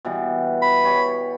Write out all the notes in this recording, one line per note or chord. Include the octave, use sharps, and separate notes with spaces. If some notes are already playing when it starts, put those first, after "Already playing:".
B2 E3 G3
B5
G3 C#5